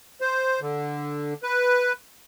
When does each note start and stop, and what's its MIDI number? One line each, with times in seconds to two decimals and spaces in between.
0.21 0.60 72
0.61 1.34 50
1.43 1.92 71